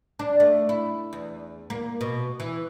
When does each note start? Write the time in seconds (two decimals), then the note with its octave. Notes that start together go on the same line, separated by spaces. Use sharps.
0.19 D4
0.40 A3
0.69 E4
1.13 E2
1.70 A#3
2.01 B2
2.40 E3